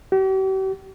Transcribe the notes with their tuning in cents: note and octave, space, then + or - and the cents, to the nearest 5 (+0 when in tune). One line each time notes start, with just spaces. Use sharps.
G4 -45